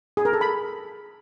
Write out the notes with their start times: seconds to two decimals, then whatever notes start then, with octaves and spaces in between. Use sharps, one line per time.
0.17 G#4
0.25 A#4
0.33 A4
0.41 B5